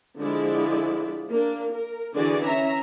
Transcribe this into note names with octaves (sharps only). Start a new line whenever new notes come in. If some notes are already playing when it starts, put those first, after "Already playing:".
D3 F3 G#3 E4 D5
A#3 D4
A#4
D3 E3 F#4 G#4 D5
C#4 E5 A#5